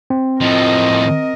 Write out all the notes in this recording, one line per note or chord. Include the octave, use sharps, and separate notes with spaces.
C4
A2 F3 A#4 D#5